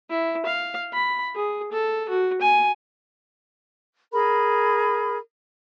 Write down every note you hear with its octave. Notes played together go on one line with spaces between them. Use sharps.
E4
F5
B5
G#4
A4
F#4
G#5
G#4 A#4 B5